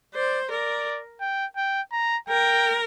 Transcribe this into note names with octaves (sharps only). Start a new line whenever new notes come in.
C5 D5
A#4 D5
G5
G5
A#5
A#4 G5